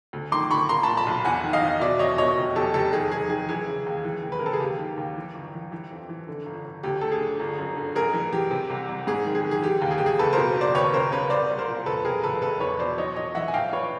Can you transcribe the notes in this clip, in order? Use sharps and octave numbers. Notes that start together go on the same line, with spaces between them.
D2
D#3 C6 D6
D2 B5 C#6
A#2 A#5 C6
A#2 A5 B5
A5 B5
B1
E2 F#5 G#5
D#3
D#5 F5
E2
B2 D5 E5
E1 C#5 D#5
B2 C#5 D#5
F1
E2 G4 A4
F1 G4 A4
D#3 G#4
D#3 G#4
D#3 G#4
E3 G#4
C#3
D#2
E3
D#2
B4
A#4
C#3 A4
G#4
D#2 G4
D#3
D#2
E3
G1
E3
E3
F2
E3
D3
G1
G1
D2 G4
D3 A4
G#4
D3
G1
F#2
D3
A1 G#4 A#4
E3
E3 G4
C3
C2
C2
G#2 G#4
D#3
G#4
D#3
G#4
E3 G4
D#2
G#4
G4
D#2
G#4
F#1 A4 B4
B2 A#4 C5
F#1 C5 D5
D#2 B4 C#5
C#3 A#4 C5
C#3 B4 C#5
C2 C5 D5
C2
A#4 C5
A#2
E1 A4 B4
C3 G#4 A#4
E1 A4 B4
E1 A4 B4
E2 B4 C#5
B2 C5 D5
E3 C#5 D#5
A#1 C#5 D#5
E3 E5 F#5
G#5
A#1 F5 G5
A#1 B4 C#5